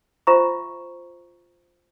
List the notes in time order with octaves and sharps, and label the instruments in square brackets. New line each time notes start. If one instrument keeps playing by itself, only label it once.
[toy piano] F4 C5 E5 A#5 C#6